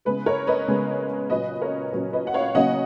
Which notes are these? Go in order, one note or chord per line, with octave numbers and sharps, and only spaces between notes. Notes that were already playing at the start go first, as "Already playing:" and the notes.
C#3 G#3 B3 B4
A#4 C#5
B4 D#5
C#3 G#3 B3
A#2 F#3 C#4 B4 D#5
A#4 C#5
A#2 F#3 C#4 B4
B4 D#5
F#5
C#5 F5
C#3 F#3 A#3 C#4 D#5 F#5